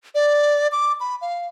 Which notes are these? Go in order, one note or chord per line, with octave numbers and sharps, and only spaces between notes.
D5
D6
B5
F5